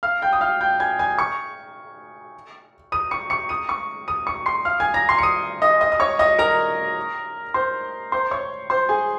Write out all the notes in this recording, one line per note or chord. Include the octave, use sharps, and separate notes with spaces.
F5 F6
G5 G6
D#6
F5 F6
G5 G6
G#5 G#6
G#5 G#6
C#6 C#7
D#6 D#7
C#6 C#7
C#6 C#7
D#6 D#7
C#6 C#7
D#6 D#7
C#6 C#7
C6 C7
F5 F6
G#5 G#6
A#5 A#6
C6 C7
C#7
D#6 D#7
D#5 D#6
D#5 D#6
D#6
C#5 C#6
D#5 D#6
A#4 A#5
C5 C6
C5 C6
C#5 C#6
C5 C6
G#4 G#5